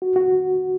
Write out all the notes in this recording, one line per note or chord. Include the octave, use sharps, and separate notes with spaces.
F#4
F#4